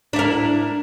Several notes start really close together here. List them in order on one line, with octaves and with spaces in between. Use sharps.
D4 E4 A#4